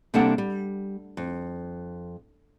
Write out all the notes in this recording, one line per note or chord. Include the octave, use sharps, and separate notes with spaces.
C3 G3 A#3 D4 A4 F#5
G3
F2